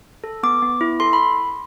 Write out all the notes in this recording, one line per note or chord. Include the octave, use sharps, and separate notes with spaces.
A4
B3 D6
B3
E4
A4 C6
B5